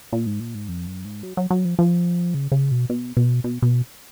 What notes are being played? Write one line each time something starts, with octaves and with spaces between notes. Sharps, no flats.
A#2
G#2
A#2
G#2
F2
F#2
G#2
F#3
F#3
F#3
F3
F3
C#3
C#3
B2
B2
B2
B2
B2